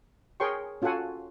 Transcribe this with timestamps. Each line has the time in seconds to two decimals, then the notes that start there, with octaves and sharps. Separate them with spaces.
0.40 G#4 A#4 C#5 G5 C6 C#6
0.82 C#4 F4 F#4 A4 F#5 G#5